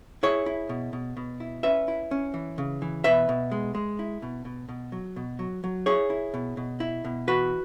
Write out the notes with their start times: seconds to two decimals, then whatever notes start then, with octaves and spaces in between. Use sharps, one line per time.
0.23 E4 G#4 C#5
0.46 E4
0.69 B2
0.93 B2
1.17 B2
1.40 E4
1.63 C#4 B4 E5
1.88 E4
2.11 C#4
2.34 E3
2.58 C#3
2.82 E3
3.04 B2 B4 E5
3.29 B2
3.52 G#3
3.75 G#3
3.99 E4
4.22 B2
4.45 B2
4.69 B2
4.92 F#3
5.16 B2
5.39 F#3
5.64 F#3
5.86 E4 G#4 C#5
6.10 E4
6.34 B2
6.57 B2
6.80 E4
7.05 B2
7.27 E3 F#4 B4